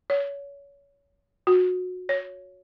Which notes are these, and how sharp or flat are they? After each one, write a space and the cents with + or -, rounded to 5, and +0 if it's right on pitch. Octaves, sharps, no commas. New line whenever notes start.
C#5 +25
F#4 -20
C#5 +10